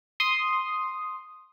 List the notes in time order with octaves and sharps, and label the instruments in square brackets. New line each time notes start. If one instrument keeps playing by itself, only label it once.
[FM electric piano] C6 D#6